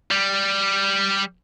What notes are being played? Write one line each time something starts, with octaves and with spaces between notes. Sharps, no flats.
G3